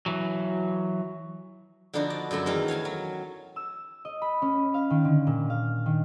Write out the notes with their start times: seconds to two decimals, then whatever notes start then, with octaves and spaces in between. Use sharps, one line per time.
0.06 E3 F#3
1.94 D3 F3 B3 D4 D#4 F#4
2.10 D5
2.31 F#2 D3 A3 F#4 E5
2.46 E2 D#3 E3 C#4 F5
2.68 C#5 F5 G#5 A5
2.85 F#3
3.56 E6
4.05 D#5
4.22 B5
4.42 C#4
4.74 F5
4.90 D#3
5.05 D3
5.27 A#2
5.50 F5
5.86 D#3